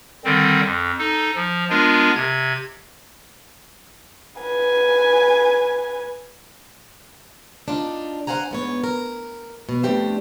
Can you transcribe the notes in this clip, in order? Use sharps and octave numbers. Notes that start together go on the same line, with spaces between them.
D3 D#3 G3 C4
F2
D#4 A4
F3
G#3 B3 D4 F4 A#4
C3 G#6
B4 G#5
D4 D#4 F4
C5 F5 F#5 G#5 A#5
G#2 B3 C#5
A#4
B2
F2 A3 D4 G4 C5